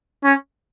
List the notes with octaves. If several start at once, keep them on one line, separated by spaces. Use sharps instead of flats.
C#4